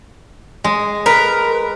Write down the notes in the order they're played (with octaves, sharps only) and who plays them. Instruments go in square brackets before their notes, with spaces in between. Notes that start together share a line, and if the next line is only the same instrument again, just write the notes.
[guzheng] G#3
[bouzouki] A#4 [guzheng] B4